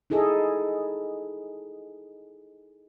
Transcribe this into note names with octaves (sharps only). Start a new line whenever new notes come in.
D#4 E4 G#4 A4 D#5